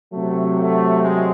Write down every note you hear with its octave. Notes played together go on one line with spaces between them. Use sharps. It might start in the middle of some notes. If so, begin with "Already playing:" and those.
C3 F#3 A3
A3
G#3